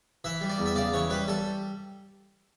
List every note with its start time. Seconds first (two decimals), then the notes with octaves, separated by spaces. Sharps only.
0.24 E3 E5
0.41 G3
0.50 D5
0.58 E2
0.66 E5
0.75 C#3 D5
0.93 E3 C#5
1.10 G3 B4
1.28 G3 A4